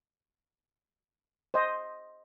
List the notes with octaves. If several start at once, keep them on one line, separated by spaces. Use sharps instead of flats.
C5 D#5